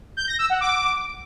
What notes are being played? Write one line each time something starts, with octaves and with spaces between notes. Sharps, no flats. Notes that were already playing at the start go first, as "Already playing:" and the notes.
G6
A#6
E6
F#5
D6